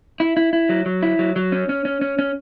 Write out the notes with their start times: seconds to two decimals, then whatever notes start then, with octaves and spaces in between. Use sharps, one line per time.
0.20 E4
0.37 E4
0.53 E4
0.69 F#3
0.86 F#3
1.03 E4
1.19 F#3
1.36 F#3
1.52 C#4
1.69 C#4
1.85 C#4
2.01 C#4
2.19 C#4